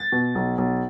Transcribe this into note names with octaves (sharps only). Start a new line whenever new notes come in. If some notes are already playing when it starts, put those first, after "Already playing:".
Already playing: A6
B2
B1
B1